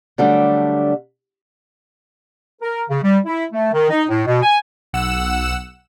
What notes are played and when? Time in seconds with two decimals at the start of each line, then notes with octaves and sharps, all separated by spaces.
0.18 D3 F#3 G3 A3 D4
2.62 A#4
2.90 C#3
3.03 G3
3.26 E4
3.52 A3
3.72 D#3
3.90 D#4
4.09 A2
4.26 B2
4.42 G#5
4.93 B1 F#5 E6 E7